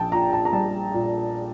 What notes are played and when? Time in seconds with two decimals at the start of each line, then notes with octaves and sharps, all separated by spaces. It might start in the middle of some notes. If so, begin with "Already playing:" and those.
Already playing: A#1 G5 A5
0.12 A#2 A#5
0.33 A5
0.45 A#5
0.53 G3 A5
0.94 A#2